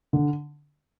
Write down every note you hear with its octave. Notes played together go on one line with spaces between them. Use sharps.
D3